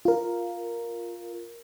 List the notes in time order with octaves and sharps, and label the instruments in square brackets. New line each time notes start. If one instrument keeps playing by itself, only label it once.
[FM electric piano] F4 A#4